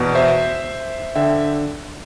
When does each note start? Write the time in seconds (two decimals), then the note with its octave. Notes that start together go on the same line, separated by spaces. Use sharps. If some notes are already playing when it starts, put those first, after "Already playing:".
Already playing: E2 B2
0.15 C5 E5
1.16 D3 E5 G5